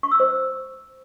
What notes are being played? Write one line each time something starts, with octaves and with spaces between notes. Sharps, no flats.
C#6
E6
C5